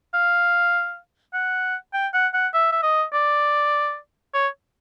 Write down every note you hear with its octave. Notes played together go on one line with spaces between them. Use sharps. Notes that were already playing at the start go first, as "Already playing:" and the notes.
F5
F#5
G5
F#5
F#5
E5
E5
D#5
D5
C#5